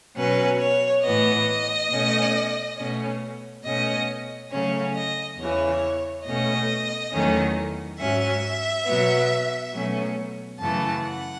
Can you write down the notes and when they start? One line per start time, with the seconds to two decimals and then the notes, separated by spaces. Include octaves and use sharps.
0.16 B2 F#3 C#4 B4
0.60 C#5
1.03 A2 E3 B3 D#5
1.90 B2 A3 C#4
2.77 B2 A3 C#4
3.64 B2 A3 C#4 D#5
4.51 C#3 F#3 A3 C#4 C#5
4.94 D#5
5.38 E2 C#3 E3 C#5
6.25 B2 A3 C#4 D#5
7.12 E2 D#3 F#3 A3 C#4
7.99 G#2 F#3 C#4 E5
8.86 B2 F#3 B3
9.73 B2 F#3 A3 C#4
10.60 F#2 C#3 E3 A3 A5
11.04 F#5